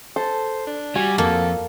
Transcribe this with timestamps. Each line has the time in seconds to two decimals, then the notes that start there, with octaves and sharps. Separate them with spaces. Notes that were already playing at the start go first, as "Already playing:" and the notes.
0.16 A4 C5
0.67 D4
0.96 G3 F#4 G#5
1.18 F2 A#3 A4